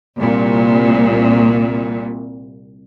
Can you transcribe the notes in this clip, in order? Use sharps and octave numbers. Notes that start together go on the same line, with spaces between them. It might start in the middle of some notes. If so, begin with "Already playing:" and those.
C2 A#2